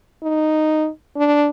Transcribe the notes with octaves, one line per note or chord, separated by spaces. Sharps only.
D#4
D4